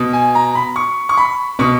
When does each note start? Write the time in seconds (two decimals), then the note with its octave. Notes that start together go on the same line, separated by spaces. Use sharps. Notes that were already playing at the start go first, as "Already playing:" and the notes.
Already playing: B2
0.13 G#5
0.35 A#5
0.55 B5
0.76 C#6
1.09 C#6
1.18 B5
1.59 B2 C#6